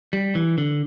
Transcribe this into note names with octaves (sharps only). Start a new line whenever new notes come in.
G3
E3
D3